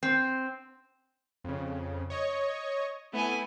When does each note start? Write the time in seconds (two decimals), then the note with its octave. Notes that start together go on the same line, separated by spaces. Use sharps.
0.03 C4
1.44 F2 C#3
2.10 C#5 D#5 C#6
3.13 A3 B3 E4 G#5